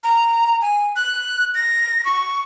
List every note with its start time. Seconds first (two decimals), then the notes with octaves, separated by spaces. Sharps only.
0.04 A#5
0.62 G#5
0.96 F#6
1.55 A#6
2.05 C#6